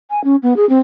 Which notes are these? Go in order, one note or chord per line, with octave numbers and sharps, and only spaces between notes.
G#5
C#4
B3
G#4
C4